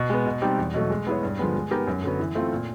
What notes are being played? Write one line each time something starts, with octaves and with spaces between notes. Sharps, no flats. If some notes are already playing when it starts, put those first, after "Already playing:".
Already playing: B2
G#3 B3
B2
G3 C4 D#4 G4
E2
B2 F#3 A3
G#3
B3 E4 G#4 C#5
G2
D3 F3 G#3 B3
G#3
B3 D#4 G4 A#4
F#2
D3 F#3 B3
E3
A3 C4 F4
A#2